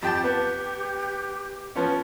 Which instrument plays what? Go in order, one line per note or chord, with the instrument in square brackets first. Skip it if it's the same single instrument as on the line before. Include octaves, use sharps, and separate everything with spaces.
[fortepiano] F2 G5 A5 [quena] G4
[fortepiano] B3
F3 B3 C#4